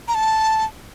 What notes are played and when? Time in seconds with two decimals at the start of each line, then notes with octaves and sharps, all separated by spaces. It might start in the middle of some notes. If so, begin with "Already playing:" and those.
0.08 A#5
0.15 A5